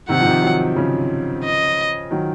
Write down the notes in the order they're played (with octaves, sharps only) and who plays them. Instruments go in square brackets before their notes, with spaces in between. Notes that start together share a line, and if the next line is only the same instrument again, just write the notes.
[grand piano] C3 D#3 [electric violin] F#5
[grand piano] F3
C3 D#3
D#3 F#3
C#3 F3
[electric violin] D#5
[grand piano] D#3 F#3